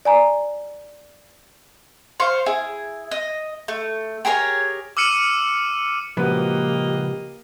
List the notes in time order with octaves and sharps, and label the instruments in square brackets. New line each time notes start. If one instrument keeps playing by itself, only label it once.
[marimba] D5 G#5 A#5
[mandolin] C5 F5 C#6
E4 G#4
D#5
A3
G4 G#4 A#4 C#5
[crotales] D6 E6 F6 C#7 D#7 E7
[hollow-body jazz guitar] C#2 A#2 F3 [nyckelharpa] A#3 D#5 [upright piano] F#4 B4 [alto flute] G4